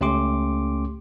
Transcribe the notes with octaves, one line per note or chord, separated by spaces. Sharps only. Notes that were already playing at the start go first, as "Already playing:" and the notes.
C#2 A3 C#4 G4 C6 D6